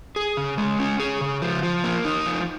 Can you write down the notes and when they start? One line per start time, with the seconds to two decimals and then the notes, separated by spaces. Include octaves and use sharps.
0.16 G#4
0.37 C#3
0.58 G#3
0.79 C#4
1.00 G#4
1.21 C#3
1.42 F3
1.63 F3
1.84 A#3
2.05 D#4
2.26 F3